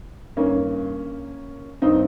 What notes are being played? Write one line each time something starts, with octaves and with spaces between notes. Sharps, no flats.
G2 D#3 A#3 C#4
G2 D#3 C4 D#4